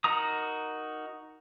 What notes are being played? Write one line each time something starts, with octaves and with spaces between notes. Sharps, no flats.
D#4 F#4 A#4 A#5 D#6